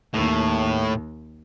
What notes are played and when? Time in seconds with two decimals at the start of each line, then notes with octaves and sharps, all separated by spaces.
0.14 D#2 A2